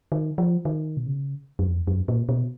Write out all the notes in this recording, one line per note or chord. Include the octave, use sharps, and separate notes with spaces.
D#3
F3
D#3
B2
C#3
F#2
F2
F#2
A#2
B2